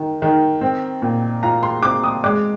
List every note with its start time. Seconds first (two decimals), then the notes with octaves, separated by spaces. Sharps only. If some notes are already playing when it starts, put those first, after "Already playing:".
Already playing: D#3
0.22 D#3
0.61 C4
1.02 A#2
1.43 F4 A#5
1.63 C6
1.83 C4 D6
2.04 D#6
2.24 G#3 D6